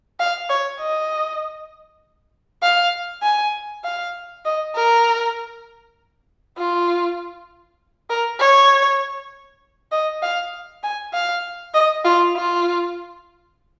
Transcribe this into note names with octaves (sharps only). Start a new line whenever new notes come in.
F5
C#5
D#5
F5
G#5
F5
D#5
A#4
F4
A#4
C#5
D#5
F5
G#5
F5
D#5
F4
F4